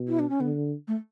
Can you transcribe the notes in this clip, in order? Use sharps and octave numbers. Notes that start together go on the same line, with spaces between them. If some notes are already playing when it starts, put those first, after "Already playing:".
Already playing: B2
E4
D4
C#4
D3 B3
A3